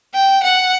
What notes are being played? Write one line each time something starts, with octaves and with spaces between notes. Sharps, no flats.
G5
F#5